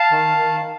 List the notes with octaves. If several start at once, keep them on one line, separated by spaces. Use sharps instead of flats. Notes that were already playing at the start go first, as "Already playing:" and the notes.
Already playing: F5 A5
D#3
D#3